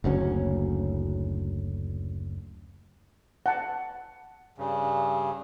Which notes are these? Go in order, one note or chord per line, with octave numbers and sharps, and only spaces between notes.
F#1 D2 F#3 C#4
F#5 A5
G2 C#3